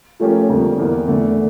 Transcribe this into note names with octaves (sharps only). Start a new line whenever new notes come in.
F3 A3 C#4 G4 A#4
F2 D3 G3 A#3
E2 E3 A#3
E2 D3 A3